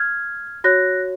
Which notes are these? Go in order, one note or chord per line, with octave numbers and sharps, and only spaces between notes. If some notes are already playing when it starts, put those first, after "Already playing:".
Already playing: F6 G#6
F#4 C#5 F#6 A#6